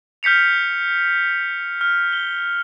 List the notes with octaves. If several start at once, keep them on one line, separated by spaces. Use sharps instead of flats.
F6 G6 B6 C#7 F7
F6
G7